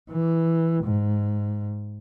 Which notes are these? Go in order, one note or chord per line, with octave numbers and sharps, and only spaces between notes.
E3
G#2